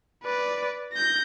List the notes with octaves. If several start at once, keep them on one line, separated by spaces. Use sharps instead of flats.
B4 D5
G6 A#6